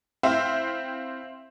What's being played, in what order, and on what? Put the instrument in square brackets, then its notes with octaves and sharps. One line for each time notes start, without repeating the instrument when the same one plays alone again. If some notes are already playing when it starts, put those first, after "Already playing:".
[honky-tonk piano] C4 E4 C5 E5 F5 G5